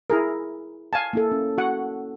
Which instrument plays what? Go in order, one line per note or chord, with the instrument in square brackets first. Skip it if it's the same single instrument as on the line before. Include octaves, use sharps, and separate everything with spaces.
[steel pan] E4 G#4 A#4
F5 G#5 A5
[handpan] A#3 E4 A4
C#4
[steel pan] F#4 F#5